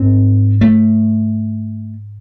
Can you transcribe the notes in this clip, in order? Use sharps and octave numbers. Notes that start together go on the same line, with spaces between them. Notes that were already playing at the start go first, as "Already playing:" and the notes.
Already playing: G#2 C4
A3